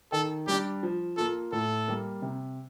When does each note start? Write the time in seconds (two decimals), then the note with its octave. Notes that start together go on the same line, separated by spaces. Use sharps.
0.12 D#3 A4
0.47 G3 D4 G4
0.83 F3
1.17 A#3 F4 A4
1.52 A2 A4
1.88 G3 A#3
2.22 C3